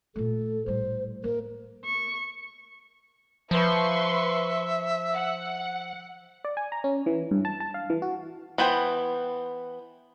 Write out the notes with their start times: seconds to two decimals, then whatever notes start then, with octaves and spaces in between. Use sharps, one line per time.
0.16 A#2 A3 A4
0.66 A2 G3 C5
1.24 A#3 A#4
1.85 C#6
3.51 F3 B4 E5 C6 C#6
5.14 F#5
6.45 D5
6.57 G#5
6.72 A#5
6.84 C#4
7.06 E3
7.31 G2
7.45 A5
7.60 A5
7.74 F5
7.90 E3
8.02 F#4
8.58 E3 B3 C5 G5 B5